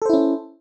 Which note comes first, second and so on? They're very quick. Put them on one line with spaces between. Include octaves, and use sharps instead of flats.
A4 C5 E4 C#4